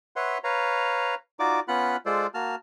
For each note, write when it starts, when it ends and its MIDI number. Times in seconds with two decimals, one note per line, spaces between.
0.16 0.38 71
0.16 0.38 73
0.16 0.38 76
0.16 0.38 78
0.16 0.38 84
0.44 1.15 71
0.44 1.15 73
0.44 1.15 77
0.44 1.15 82
1.39 1.60 63
1.39 1.60 65
1.39 1.60 66
1.39 1.60 74
1.39 1.60 86
1.68 1.96 59
1.68 1.96 61
1.68 1.96 65
1.68 1.96 78
1.68 1.96 83
1.68 1.96 90
2.06 2.27 56
2.06 2.27 65
2.06 2.27 69
2.06 2.27 72
2.06 2.27 74
2.34 2.55 58
2.34 2.55 66
2.34 2.55 81
2.34 2.55 89